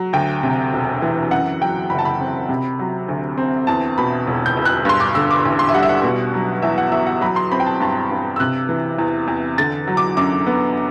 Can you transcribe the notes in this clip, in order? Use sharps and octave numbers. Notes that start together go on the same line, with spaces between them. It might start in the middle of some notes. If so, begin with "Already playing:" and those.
Already playing: F#3
D2 G5
C3
E1
E3
F#2 F#5
F#3 G5
F#1 B5
A5
B5
C4
C3
F#3
D2
C4
E2 A5
B2 B5
E1
G6
E1
F#6
G2 C6
D6
D3 E6
D6
A1
C6
E5
G3 F#5
E5
F#5
B2
F#3
E2 E5
F#5
E2 E5
F#5
F#3 B5
C6
C4 B5
G5
A5
G2 A5
G2
E6
C3 F#6
E3
E2
E2
D3 A6
F#3
D6
F#2 D6
B3